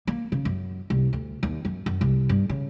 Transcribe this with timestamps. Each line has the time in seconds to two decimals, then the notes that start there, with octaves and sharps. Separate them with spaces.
0.07 A#3
0.32 C#3
0.45 F#2
0.90 C2
1.13 D2
1.43 D#2
1.65 F#2
1.86 F#2
2.01 C2
2.29 G2
2.49 C#3